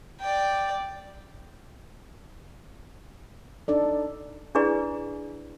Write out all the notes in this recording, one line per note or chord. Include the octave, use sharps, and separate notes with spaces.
D5 G5
D4 D#4 A4 D5
D4 E4 G#4 B4 D5